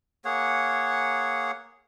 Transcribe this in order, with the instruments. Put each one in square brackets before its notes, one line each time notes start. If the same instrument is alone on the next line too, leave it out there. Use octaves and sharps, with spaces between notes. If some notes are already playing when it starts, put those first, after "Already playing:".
[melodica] A#3 G#4 C#5 F#5